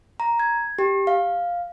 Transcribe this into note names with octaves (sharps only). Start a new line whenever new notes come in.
A#5
G#6
G4
F5